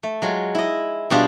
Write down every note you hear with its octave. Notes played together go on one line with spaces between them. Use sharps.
A3
F#3 G#3 F4
E4 D#5
B2 G3 D4 F4 G4 G#4